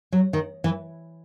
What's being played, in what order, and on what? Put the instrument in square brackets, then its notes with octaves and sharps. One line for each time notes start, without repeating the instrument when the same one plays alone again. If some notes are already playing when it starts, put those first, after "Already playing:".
[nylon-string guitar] F#3
D#3
E3